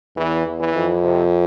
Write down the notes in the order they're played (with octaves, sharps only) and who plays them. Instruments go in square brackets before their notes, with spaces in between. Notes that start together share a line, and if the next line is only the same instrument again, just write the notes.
[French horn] E2 [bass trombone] E3
[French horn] E2
[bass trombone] E3
[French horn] F2
[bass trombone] C3